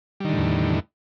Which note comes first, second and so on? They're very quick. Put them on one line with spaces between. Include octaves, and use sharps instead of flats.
G3 D#3 D3 A2 E2